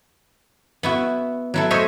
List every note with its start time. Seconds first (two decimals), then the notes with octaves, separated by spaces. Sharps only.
0.83 B3 E4 F#4
1.54 F#3 E4 A4
1.70 A3 C5 C#5 D#5 E5